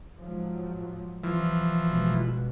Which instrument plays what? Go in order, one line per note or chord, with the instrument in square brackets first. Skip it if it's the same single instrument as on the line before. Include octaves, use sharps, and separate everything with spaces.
[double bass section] G#2 F3 F#3
[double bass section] C2 [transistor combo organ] E3 F3
[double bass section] G1 B2 G#3